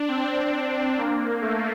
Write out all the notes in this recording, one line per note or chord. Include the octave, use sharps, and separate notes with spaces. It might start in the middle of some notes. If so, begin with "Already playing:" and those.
Already playing: D4
C4
A#3
A3